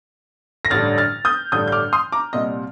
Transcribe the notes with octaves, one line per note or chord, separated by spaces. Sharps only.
A#6
A1 G2 D3 G3 D4 F6 A6
F6 A6
D#6 G6
A1 G2 D3 G3 D4 D#6 G6
G6
D6 F6
C6 D#6
A#5 D6
C2 A#2 G3 D#5